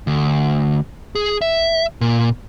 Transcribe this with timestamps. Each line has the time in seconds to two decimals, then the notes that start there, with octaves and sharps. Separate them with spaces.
0.07 D2
1.15 G#4
1.41 E5
2.01 A#2